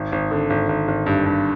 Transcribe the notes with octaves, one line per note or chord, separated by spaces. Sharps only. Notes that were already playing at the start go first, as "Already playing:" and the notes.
Already playing: G#1
G#1
D3
G#1
G#1
G#1
G2
G2